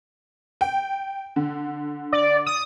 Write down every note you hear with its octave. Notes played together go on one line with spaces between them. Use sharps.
G5
D3
D5
D#6